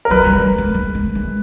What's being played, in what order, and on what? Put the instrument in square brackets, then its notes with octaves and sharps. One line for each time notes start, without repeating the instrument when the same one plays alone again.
[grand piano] A#4
[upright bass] F#3 [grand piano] B4
[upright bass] G3
G#3
A3
G#3
A3
G#3